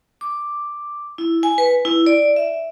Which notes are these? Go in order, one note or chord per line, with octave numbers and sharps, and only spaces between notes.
D6
E4
G#5
B4
E4
D5
E5